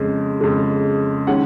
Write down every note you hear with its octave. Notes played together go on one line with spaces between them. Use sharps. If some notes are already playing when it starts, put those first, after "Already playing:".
Already playing: F2 C#3 G#3
F2 C#3 G#3
D#3 G#3 C#4 F#5